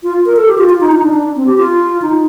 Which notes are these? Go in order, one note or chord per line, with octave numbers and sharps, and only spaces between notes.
F4
A#4
A4
G4
F4
F4
D#4
D#4
D4
D4
C4
G4
F4
D#4